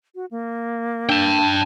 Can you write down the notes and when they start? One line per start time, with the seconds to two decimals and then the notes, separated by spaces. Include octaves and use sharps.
0.15 F#4
0.31 A#3
1.09 D4 G5 A5